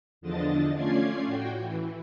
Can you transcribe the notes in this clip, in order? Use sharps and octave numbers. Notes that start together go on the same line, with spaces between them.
E2 D3 F3 D4 D#5 A6
A3 C#4 F4 D5 G#6 C7
A2 F#4 G5
E3